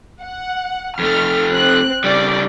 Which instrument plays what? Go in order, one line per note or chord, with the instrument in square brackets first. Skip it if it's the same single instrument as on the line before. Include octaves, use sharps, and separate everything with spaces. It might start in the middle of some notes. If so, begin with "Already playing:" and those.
[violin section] F#5
[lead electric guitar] F2 A3 [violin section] F6
[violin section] C4 F#6
[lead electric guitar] C#3 G3 [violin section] D5